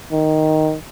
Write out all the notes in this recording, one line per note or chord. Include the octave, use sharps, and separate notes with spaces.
D#3